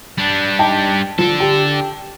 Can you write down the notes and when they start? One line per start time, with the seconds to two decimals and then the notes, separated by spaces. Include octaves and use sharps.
0.18 G3 D4
0.59 D#4 G5 A5
1.18 F3 D4 A4
1.40 G4